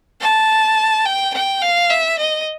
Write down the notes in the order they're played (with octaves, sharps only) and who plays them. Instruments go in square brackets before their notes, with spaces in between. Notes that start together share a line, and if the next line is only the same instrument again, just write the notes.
[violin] A5
G5
G5
F5
E5
D#5